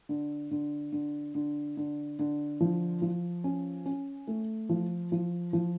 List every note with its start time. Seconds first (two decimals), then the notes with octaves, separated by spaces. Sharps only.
0.09 D3
0.51 D3
0.92 D3
1.35 D3
1.77 D3
2.19 D3
2.61 F3
3.02 F3
3.44 C#4
3.86 C#4
4.27 A3
4.69 F3
5.12 F3
5.53 F3